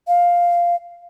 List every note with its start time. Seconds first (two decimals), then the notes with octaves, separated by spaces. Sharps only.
0.07 F5